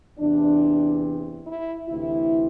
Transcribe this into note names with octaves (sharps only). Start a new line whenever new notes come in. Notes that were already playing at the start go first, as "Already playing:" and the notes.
E2 C3 E3 D4
E4
D2 C3 E3 E4